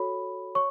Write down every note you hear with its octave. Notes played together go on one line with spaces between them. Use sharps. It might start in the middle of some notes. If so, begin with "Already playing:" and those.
Already playing: F#4 A4 C#5 B5
C#5 C#6